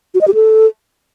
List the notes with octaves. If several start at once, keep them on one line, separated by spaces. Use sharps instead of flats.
F#4
D#5
G4
A4